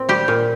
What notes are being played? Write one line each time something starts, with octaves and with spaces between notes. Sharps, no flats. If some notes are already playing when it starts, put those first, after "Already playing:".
Already playing: A#2 C4
G3 G4
A#2